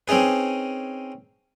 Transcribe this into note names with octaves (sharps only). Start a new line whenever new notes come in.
C4 C#4 D#4 G#4 B4